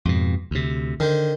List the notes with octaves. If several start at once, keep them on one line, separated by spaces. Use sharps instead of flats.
F2 G#2 B2
D2 C3
D3 D#3 C5